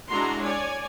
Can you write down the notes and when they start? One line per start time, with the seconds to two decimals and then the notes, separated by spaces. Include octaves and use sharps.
0.11 G#3 D4 E4 F#4 A#5 C6
0.43 C#5 D5 G#5